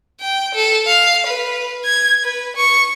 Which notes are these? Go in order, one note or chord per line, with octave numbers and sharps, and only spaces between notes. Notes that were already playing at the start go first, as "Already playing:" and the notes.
G5
A4
F5
B4
G#6
B4
C#6